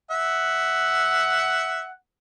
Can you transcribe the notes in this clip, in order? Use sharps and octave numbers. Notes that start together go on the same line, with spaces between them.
E5 F#5